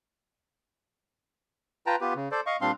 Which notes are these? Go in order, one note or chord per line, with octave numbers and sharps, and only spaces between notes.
F4 B4 G5 A5 A#5
B3 F4 G4 B4
C#3
A4 C5 D5
D#5 F5 C#6
A#2 G3 C4 D4 F5 C6